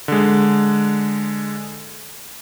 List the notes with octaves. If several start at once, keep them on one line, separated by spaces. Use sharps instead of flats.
D3 G#3